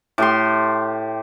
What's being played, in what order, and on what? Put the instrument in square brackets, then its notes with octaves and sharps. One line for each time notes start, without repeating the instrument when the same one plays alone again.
[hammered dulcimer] A2 G4 C6